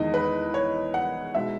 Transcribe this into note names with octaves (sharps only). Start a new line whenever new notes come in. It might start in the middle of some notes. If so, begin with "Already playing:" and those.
Already playing: E2 D#3 G#3 D#4 D#5
B4
C#5
F#5
B2 G#3 D#4 E5